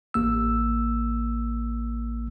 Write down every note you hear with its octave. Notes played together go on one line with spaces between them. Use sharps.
A1 A#3 E6